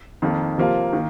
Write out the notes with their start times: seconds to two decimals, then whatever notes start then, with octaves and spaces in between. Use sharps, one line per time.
0.22 F2 D#3 A#3
0.58 C3 F3 A#3 F4
0.93 D#3 A#3